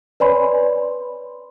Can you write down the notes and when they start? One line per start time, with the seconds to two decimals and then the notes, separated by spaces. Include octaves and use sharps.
0.20 B4 C#5 D5 G#5 B5 C6